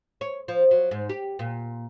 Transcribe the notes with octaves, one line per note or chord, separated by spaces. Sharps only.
C#5
F3
F#3
G#2
G4
A#2